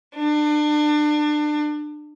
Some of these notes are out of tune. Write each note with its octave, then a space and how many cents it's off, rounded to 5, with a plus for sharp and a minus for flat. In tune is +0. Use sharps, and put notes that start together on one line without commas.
D4 +30